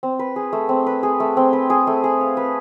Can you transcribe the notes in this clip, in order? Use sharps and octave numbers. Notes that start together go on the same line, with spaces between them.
C4
B4
G#4
A3
C4
B4
G#4
A3
C4
B4
G#4
A3
G#4
F5
B4